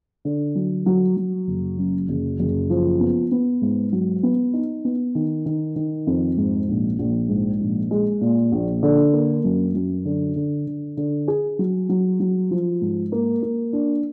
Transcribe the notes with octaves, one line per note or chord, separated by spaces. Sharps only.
D3
F#3
F#3
F#3
F#1
F#2
F#1
F#1
F3
B3
B3
G#2
F#3
B3
D#4
B3
D#3
D#3
D#3
F2
G#2
A#1
A#1
G#2
A#1
G#3
A#2
A#1
D3
A#3
F#2
F#2
D3
D3
D3
D3
G#4
F#3
F#3
F#3
F3
G#2
A#3
A#3
D4